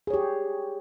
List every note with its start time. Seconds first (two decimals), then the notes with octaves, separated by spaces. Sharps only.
0.07 G#4
0.10 C#5
0.14 G4